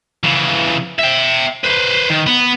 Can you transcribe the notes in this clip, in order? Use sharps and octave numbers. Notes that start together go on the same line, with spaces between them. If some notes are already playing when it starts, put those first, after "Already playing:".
C#3 E3
E5 G5
B4 C5
D#3
B3